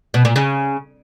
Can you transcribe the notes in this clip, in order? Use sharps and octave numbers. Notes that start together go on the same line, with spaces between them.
B2
A#2
C#3